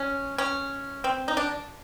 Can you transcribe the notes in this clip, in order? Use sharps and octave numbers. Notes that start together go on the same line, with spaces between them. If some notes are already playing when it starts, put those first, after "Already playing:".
Already playing: C#4
C#4
C4
D#4
D4